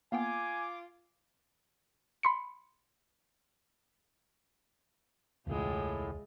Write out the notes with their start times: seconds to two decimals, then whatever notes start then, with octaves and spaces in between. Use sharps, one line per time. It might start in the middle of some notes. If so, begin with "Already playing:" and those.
0.12 A#3 B3 F4 G5 G#5 D6
2.23 B5 C6 C#7
5.47 E1 C#2 A2 G#3 F4